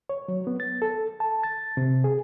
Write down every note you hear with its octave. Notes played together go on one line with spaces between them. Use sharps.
C#5
F#3
B3
A6
A4
A5
A6
C3
G#4